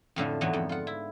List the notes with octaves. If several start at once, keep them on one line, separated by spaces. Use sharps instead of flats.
F2 A2 D3 F3
E2 G#2 D3 E3 F#3 B3
F2
F4 F#5
E4